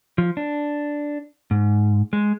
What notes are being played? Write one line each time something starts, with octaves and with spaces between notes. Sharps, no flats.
F3
D4
G#2
G#3